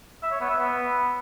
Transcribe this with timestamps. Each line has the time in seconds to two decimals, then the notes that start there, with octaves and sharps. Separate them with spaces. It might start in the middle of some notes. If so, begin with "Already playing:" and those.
0.23 E5
0.32 C#5
0.40 B3
0.49 E5
0.58 B3